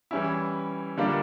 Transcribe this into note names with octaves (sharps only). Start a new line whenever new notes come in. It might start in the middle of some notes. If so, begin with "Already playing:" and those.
E3 G3 C#4 E4
D3 G3 A#3 D4 F4